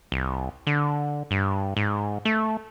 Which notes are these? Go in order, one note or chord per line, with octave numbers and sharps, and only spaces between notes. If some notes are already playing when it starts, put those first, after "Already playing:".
C2
D3
G2
G#2
A3